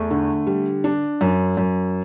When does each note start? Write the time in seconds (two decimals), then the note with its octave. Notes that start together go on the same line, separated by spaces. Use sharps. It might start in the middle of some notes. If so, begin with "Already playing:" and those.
Already playing: E2 A3
0.11 D3
0.47 G3
0.84 D4
1.21 F#2
1.57 F#2